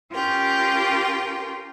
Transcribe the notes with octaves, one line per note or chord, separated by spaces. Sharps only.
C#4 F4 G4 A#4 G5